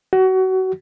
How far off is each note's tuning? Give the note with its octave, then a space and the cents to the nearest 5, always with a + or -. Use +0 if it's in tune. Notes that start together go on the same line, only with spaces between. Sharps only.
F#4 +25